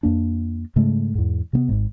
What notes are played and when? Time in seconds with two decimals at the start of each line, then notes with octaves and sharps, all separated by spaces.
0.03 F2 A#3 D4
0.76 G#2 C#3 G#3 A3
1.15 E2 G#2
1.53 C3 A#3 B3
1.69 G#1 G#2